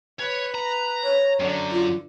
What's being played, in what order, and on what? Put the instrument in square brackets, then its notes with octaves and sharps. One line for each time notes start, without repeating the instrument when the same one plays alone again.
[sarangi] B4 [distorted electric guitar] C#5
[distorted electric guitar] A#5
[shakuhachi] C#5
[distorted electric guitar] F#2 F#3 [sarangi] D3
[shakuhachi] F4